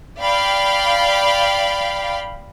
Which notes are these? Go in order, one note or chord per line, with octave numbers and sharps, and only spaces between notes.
D5 F5 G5 B5